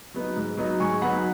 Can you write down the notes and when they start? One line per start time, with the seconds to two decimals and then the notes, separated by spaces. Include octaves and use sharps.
0.14 F#3 B3 D#4
0.37 G#2
0.57 F#3 B3 D#4
0.80 G#2 G#5 C#6
1.02 F#3 B3 D#4 F#5 B5